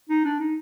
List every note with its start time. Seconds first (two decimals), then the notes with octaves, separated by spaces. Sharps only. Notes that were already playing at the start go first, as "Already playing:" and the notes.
0.09 D#4
0.24 D4
0.39 D#4